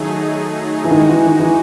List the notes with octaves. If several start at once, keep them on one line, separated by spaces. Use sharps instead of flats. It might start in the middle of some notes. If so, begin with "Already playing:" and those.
Already playing: D#3 F#3 A3 D#4 G#4
E3
D#3 G#3 D#4 F#4
E3
D#3
E3